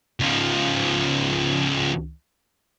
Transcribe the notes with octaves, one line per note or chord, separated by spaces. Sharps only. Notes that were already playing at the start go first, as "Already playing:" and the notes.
C#2 F3